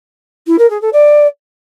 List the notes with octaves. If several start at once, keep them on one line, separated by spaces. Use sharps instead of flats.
E4
A#4
G#4
A4
D5